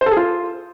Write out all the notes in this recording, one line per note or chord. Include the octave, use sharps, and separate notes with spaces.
C5
A4
G#4
F4